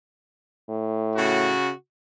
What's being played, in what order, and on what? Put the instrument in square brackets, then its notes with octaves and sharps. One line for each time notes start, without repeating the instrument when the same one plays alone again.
[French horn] A2
[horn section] C#3 F#4